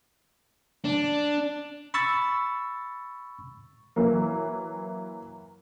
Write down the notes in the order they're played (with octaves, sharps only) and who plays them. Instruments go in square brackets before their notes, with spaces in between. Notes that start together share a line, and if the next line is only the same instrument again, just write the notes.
[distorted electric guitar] D4
[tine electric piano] B5 C#6 E6 A6
[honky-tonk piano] E3 F#3 A#3